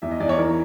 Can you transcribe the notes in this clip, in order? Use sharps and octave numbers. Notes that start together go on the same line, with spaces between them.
E2 E5
D#5
E2 D5
C#5
E3 A#4